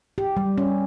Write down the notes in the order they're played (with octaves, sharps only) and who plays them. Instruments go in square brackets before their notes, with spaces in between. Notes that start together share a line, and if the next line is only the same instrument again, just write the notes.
[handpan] G4
G3
C#4